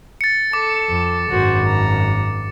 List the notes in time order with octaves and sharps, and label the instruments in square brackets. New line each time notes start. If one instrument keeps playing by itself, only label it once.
[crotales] A6 C#7
[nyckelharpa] A4 A5 [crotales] D6
[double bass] F2
[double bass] G#1 F#2 [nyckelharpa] F#4 C5
[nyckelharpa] A#5